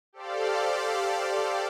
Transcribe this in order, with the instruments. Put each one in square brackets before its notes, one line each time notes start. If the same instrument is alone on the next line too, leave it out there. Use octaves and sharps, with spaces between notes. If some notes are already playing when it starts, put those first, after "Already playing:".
[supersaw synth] G4 A4 C5 D5 F5